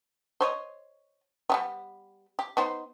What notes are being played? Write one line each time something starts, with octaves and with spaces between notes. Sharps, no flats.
C5 C#5 D#5
G3 G#3 B3
G4
B3 D#4 C5